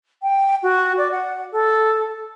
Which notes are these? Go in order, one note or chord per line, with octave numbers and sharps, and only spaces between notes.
G5
F#4
D5
F#5
A4